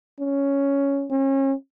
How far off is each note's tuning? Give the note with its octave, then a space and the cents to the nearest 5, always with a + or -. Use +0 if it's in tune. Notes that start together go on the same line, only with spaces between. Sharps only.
C#4 +5
C#4 -35